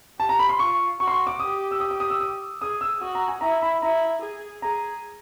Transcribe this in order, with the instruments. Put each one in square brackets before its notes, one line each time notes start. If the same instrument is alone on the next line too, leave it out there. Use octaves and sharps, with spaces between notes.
[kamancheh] G4 [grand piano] A5
[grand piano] A#5
B5
C6
[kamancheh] F4 [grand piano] C#6
[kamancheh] F#4 [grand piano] C#6
[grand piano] C6
C#6
D6
[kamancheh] G4 [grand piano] D#6
[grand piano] E6
D#6
D6
D#6
E6
D#6
[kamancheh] G#4 [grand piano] D#6
[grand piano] E6
[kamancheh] F#4 [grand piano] D#6
[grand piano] A#5
G#5
[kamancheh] E4 [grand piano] A#5
[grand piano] B5
[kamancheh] E4 [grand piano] A#5
[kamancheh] G#4
[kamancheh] G#4 [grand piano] A#5